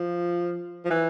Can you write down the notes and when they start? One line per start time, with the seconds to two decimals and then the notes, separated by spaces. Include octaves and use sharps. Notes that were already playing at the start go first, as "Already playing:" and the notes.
Already playing: F3
0.85 F3
0.90 E3